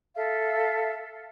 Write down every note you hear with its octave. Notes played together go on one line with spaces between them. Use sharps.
A4 E5 F5